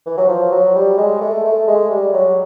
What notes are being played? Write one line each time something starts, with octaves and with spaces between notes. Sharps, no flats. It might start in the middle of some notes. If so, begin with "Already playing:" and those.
E3
F#3
F3
F#3
G3
G#3
A3
A3
G#3
G3
F#3